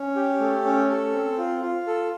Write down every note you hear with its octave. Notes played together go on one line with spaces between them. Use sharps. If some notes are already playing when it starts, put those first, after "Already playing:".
Already playing: C#4
G4
A3
C#4
A4
C4
F4
F4
A4